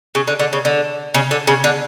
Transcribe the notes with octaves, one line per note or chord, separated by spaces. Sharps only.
C#3
D3
D3
C#3
D3
C#3
D3
C#3
D3